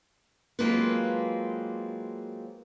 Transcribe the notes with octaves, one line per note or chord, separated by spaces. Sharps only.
F#3 G#3 A#3 C4 F4 B4